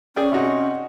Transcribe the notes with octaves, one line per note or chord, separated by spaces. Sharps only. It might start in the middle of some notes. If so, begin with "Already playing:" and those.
C#4 G#4 D5 G5
C3 D#4 F#4